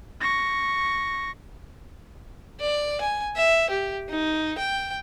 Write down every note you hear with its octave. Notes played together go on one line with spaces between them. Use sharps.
C#6 A#6
D5
G#5
E5
G4
D#4
G5